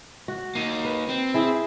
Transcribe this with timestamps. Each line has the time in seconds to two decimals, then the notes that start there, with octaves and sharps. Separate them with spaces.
0.28 F#4
0.55 A#3 D#4
0.85 B4
1.09 C4
1.34 E4 G#4